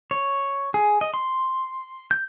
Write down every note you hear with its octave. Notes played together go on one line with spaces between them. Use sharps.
C#5
G#4
D#5
C6
G6